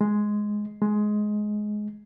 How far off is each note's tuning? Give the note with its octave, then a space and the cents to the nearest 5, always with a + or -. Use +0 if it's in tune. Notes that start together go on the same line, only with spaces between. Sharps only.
G#3 +5
G#3 +15